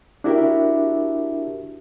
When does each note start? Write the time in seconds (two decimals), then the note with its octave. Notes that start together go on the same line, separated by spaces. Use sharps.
0.24 D4 E4 F#4 G4 A#4 E5